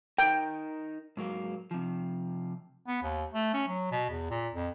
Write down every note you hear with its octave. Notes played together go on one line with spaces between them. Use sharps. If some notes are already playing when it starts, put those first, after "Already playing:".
D#4 A#4 G5
G#2 F#3 A#3
C3 F3
B3
D#2
A3
C#4
F#3
B2
E2
A#2
F2